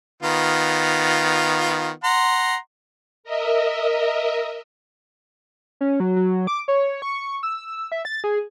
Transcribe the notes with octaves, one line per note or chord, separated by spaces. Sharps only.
D#3 B3 F4
F#5 A#5 C6
A#4 D#5 E5
C#4
F#3
F#3
D6
C#5
C#6
E6
E5
A6
G#4